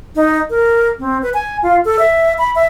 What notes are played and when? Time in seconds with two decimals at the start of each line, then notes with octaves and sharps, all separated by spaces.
0.16 D#4
0.50 A#4
0.99 C4
1.22 B4
1.34 G#5
1.63 F4
1.85 A4
1.99 E5
2.38 B5
2.55 E5